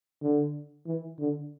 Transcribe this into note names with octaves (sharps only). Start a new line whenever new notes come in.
D3
E3
D3